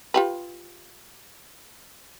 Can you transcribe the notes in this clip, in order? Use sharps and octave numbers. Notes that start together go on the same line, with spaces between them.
F4 G4 B4